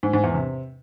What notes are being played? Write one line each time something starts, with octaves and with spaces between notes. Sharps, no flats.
G#2
G#2
E2
C3